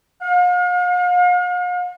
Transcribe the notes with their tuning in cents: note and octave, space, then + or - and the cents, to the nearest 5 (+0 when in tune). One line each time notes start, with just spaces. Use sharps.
F5 +45